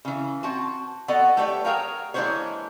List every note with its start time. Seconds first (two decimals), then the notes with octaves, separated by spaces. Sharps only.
0.05 C#3 E3
0.43 C4 F#4 A5
1.08 B3 F#4 A4 D5 D#5 F#5
1.37 A3 G4 B4 C#5 D5
1.65 G#4 A#4 C#5 F5 G5 A#5
2.14 E3 G#3 A#3 D4 C5 C#5